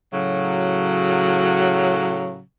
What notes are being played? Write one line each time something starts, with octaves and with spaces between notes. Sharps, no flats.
A2 C#3 F#3